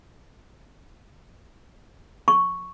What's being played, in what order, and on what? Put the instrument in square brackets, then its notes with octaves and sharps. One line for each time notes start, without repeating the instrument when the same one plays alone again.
[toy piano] C#6